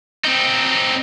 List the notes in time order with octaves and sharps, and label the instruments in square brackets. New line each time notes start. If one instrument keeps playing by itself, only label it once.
[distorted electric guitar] C4 D#4